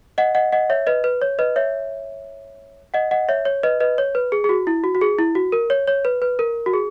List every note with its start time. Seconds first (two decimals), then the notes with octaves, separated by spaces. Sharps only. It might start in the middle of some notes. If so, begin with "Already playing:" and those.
0.18 D#5 F#5
0.35 D#5 F#5
0.52 D#5 F#5
0.70 C#5 E5
0.87 B4 D#5
1.04 B4
1.21 C#5
1.39 B4 D#5
1.56 C#5 E5
2.94 D#5 F#5
3.11 D#5 F#5
3.29 C#5 E5
3.45 C#5
3.63 B4 D#5
3.80 B4 D#5
3.98 C#5
4.15 B4
4.32 G#4
4.44 G#4
4.49 F#4
4.67 E4
4.84 F#4
4.95 F#4
5.01 G#4
5.19 E4
5.35 F#4
5.52 A#4
5.70 C#5
5.87 C#5
6.05 B4
6.22 B4
6.39 A#4
6.66 F#4
6.73 G#4